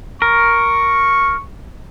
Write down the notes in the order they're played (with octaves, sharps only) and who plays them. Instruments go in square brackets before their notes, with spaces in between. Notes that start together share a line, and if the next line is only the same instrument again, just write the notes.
[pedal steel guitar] A#4 [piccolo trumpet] C#6